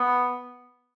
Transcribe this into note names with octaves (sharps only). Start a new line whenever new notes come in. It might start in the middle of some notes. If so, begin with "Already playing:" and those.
Already playing: B3